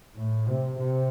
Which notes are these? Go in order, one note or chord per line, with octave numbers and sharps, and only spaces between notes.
A2
C3
C3